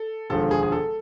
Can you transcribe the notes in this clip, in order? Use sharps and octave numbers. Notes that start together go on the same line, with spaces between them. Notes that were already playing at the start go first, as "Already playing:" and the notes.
Already playing: A4
E1 D#2 D3 F3 G#3 A4
G#4
G#4
A4